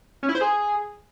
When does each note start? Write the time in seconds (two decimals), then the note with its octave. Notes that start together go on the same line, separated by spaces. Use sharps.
0.23 C#4
0.29 E4
0.35 C5
0.41 G#4